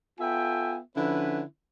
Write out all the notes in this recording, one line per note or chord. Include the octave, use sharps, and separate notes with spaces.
B3 F4 A4 E5 G5 G#5
D3 F3 C#4 E4 B4